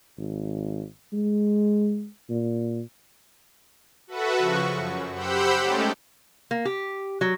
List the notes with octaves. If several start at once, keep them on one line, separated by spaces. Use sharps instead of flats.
G#1
G#3
A#2
F#4 A4 B4 E5 F#5
C#3 F3 F#4 C#6
F#2
G4 C5 F#5 B5 E6 G6
G#3 A3 C#4 D#4 G4 A4
A#3
G4
F#3